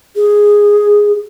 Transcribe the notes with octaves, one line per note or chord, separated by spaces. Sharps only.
G#4